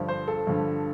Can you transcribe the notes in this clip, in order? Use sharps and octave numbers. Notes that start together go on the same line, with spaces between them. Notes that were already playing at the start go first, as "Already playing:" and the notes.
Already playing: G2 D3 F3
C5
A4
G2 D3 F3